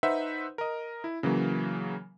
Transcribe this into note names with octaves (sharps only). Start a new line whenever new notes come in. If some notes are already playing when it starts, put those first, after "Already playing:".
D#4 B4 C5 E5 F#5
A#4 D#5
E4
C#3 E3 F#3 A#3